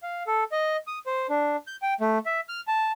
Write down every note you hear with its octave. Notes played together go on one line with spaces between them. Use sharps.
F5
A4
D#5
D#6
C5
D4
G6
G5
A3
E5
F6
A5